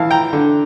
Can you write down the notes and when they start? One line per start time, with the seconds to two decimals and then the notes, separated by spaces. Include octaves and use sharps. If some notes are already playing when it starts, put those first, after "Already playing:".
Already playing: E3 F5 A5
0.11 G5 A#5
0.33 D3